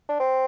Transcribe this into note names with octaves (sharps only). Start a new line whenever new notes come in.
D4
C4